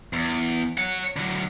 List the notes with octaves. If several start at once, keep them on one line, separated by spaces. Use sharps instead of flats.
E2
C#5 F#5
D3 F#3